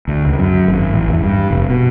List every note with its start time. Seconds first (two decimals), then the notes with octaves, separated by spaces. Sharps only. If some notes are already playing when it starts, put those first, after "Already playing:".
0.08 D2
0.25 C#2
0.39 F#2
0.68 G#1
0.94 A1
1.08 E2
1.23 G2
1.51 F1
1.70 B2